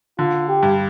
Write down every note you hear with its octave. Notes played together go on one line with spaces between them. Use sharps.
D3 F4
G4
G2